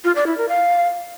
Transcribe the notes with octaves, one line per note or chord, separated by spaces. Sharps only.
F4
D5
E4
A#4
F5